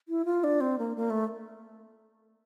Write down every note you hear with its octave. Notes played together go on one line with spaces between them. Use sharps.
E4
F4
D4
C4
A#3
A#3
A3